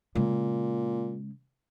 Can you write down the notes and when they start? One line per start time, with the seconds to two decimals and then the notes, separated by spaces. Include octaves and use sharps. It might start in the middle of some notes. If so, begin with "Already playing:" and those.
0.15 A#2 C#3 G#3